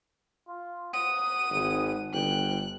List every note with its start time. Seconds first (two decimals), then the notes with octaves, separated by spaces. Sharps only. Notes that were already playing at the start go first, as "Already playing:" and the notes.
0.48 F4
0.93 F#5 D#6 D#7
1.51 G#1
2.13 G1 G5 F#6